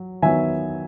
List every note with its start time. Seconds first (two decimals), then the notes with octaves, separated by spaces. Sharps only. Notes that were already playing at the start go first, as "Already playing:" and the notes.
Already playing: F#3
0.22 D#3 F#3 B3 E5 G#5